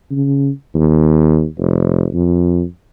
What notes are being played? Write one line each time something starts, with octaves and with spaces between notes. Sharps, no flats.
C#3
D#2
F1
F2